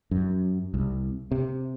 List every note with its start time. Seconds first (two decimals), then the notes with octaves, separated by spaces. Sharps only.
0.11 F#2
0.74 C2
1.31 C3